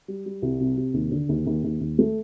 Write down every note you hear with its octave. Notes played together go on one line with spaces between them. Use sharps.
G3
G3
C2
C3
C3
D#2
D3
D#2
D#2
D#2
D#2
A3